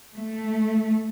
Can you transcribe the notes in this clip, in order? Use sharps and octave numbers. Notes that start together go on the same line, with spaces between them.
A3